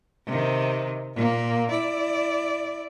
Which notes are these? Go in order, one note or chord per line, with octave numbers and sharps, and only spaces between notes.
C3 D#3
A#2 A#3
E4 D5